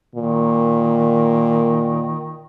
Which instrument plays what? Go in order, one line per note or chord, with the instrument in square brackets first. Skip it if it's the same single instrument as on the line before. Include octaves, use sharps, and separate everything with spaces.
[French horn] A#2 [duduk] D#3